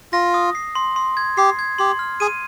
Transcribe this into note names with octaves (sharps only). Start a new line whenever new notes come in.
F4 A#6
D#6
C7
C6
C6
G#6
G4 C7
G#6
G4 C6
F6
G#4 D#7